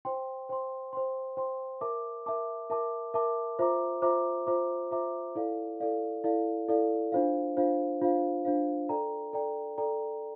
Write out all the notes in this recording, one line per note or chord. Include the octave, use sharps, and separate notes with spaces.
C5 G5 C6
C5 G5 C6
C5 G5 C6
C5 G5 C6
A#4 E5 A5 D6
A#4 E5 A5 D6
A#4 E5 A5 D6
A#4 E5 A5 D6
F4 C5 E5 A#5 D6
F4 C5 E5 A#5 D6
F4 C5 E5 A#5 D6
F4 C5 E5 A#5 D6
E4 A4 D5 F5
E4 A4 D5 F5
E4 A4 D5 F5
E4 A4 D5 F5
D4 F4 C5 F5
D4 F4 C5 F5
D4 F4 C5 F5
D4 F4 C5 F5
A4 D5 G5 A#5
A4 D5 G5 A#5
A4 D5 G5 A#5